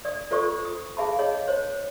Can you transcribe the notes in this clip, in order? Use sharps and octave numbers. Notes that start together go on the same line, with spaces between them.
D5 D#6
F4 A4 C5 D5 C#6 D#6
D#6
G#4 E5 F5 A5 B5
G#4 C#5 D#5
C5 C#5